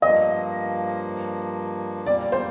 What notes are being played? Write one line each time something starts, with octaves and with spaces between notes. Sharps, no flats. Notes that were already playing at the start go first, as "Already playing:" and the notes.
G2 F3 A#3 D#5
A#2 G3 A#3 D5
C5